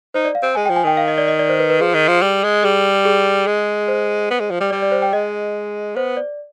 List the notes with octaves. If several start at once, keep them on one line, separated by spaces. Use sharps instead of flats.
D#4 C5
D5
F5
C4
G#3 G#5
F3 G5
G#5
D#3 G5
F5
D#5
D5
D#5
D5
C5
B4
B4
F3 G#4
D#3
F3
G3
G#3
G3 G#4
G#4
G#3
C5
B3
G#3
F3
G3
G3 D5
D5
C5
G5
G#3 D#5
B3 C5
D5